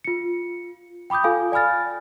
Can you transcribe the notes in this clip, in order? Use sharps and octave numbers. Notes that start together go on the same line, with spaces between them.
F4 C#7
G5 B5 D6 D#6 G6
F4 A4 F5 G#5
D5 G#5 B5 F6 A6